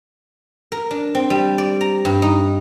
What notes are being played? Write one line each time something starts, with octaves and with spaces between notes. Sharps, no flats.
A#4
D4
C4
G3
D5
A#5
G2
D#4